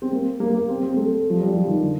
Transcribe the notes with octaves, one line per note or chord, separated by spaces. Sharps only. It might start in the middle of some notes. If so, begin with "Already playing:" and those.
C4
A#3
A#3
A#3
C4
C4
A3
F3
G3
F3
D#3
D3